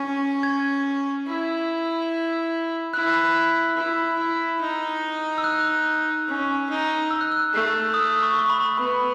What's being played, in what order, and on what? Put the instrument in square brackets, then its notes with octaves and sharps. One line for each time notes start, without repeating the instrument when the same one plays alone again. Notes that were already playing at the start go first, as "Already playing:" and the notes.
Already playing: [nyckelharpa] C#4
[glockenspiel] G#6
[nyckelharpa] E4
[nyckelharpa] E4 [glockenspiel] F#6
[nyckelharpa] E4
E4
D#4
[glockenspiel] E6
F#6
[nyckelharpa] C#4
D#4
[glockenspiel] E6
F#6
E6
[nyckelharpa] A3
[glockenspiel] D#6
C#6
C#6
B5
[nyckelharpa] B3 [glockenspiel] B5